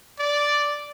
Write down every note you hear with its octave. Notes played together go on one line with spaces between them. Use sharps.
D5